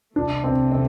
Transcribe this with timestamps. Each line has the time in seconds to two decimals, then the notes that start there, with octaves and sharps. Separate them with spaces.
0.16 C2 C3 E3 A3 D4
0.44 C4
0.72 C4